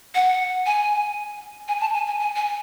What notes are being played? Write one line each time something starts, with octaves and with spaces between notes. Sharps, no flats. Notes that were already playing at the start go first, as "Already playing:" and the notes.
F#5
G#5
G#5
A5
G#5
G#5
G#5
G#5